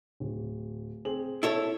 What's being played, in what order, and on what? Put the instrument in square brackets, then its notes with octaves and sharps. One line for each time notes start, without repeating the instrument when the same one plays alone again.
[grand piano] D1
C4 G#4 F#7
[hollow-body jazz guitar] E4 A4 C#5